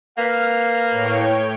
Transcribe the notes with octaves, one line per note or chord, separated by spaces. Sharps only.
A#3 B4 F5 F6
A2 C#5 G5